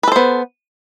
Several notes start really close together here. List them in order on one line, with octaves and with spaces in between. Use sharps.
B4 A4 C5 B3